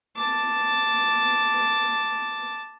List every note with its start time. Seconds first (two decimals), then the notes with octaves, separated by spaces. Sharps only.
0.17 A5 D6